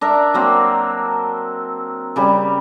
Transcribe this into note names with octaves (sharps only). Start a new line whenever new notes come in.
D4 A#4 E5
F#3 A#3 C4
C#3 G3